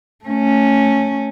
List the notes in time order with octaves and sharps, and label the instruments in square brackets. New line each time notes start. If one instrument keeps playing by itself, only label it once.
[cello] A3 C#4